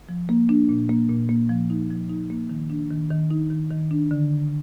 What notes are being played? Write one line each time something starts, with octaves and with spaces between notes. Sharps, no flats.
F3
A#3
D4
A#2
A#3
A#2
A#3
F3
D#4
F3
D#4
A#3
D#3
D4
D#3
D#3
D#4
D#3
D#3
D4
D3